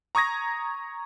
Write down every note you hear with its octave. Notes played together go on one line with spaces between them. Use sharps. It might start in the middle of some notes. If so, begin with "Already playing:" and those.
A#5 C#6 D#6 G#6 A#6